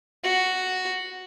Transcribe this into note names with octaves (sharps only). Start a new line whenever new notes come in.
F#4